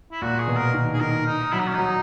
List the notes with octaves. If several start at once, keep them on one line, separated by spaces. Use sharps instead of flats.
E4
A#2 F#4
G#4
B2
A#4
D#3
G#4
D#3 A#4
D#4
F#3 E4
D#4
C#4
F#3 D#4